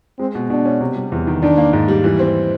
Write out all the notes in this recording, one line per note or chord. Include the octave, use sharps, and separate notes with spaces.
G#3 C4
B2
B2 D4
C#4
C3
G3
E2
D#3
D#3 D4
A#3
G#2
G3
E3
C4